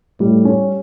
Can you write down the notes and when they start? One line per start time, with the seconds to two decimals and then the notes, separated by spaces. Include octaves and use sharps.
0.20 A2 G3
0.45 C#4